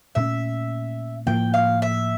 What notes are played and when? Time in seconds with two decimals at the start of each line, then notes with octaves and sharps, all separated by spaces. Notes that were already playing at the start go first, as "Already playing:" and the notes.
0.15 A#2 A3 C#4 E5
1.27 A2 F3 A#3 G5
1.54 F5
1.82 E5